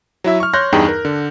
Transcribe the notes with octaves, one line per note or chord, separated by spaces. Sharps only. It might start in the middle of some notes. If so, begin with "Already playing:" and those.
F#3 E4 E5
C#6 F6
C#5 C6 F#6 G6 A#6
E2 G2 D#4 G#4 G5
A#4
D3